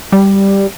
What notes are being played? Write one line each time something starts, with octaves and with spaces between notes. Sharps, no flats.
G3